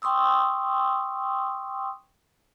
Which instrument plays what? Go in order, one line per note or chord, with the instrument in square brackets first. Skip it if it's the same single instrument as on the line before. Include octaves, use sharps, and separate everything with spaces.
[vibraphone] G5 C6 C#6 D#6 E6